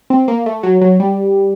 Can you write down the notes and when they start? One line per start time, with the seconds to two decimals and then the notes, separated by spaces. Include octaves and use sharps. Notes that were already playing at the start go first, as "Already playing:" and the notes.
0.10 C4
0.28 A#3
0.46 A3
0.63 F#3
0.81 F#3
1.00 G3